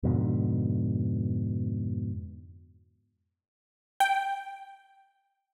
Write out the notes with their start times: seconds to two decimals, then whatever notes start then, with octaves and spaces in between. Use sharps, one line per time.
0.03 F2 G#2 B2 D3
4.00 G5